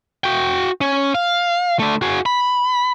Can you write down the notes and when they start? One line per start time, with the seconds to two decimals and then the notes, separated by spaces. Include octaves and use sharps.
0.24 F#4 G5
0.81 C#4
1.15 F5
1.79 D3 A3
2.02 F#4 G#4
2.26 B5